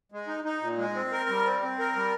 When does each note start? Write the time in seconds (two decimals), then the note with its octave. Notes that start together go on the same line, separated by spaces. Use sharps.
0.12 G#3
0.27 D#4
0.44 D#4
0.62 A#2
0.78 G#3
0.94 C4
1.12 A#4
1.29 G3
1.45 C4
1.62 C4
1.79 A#4
1.96 G3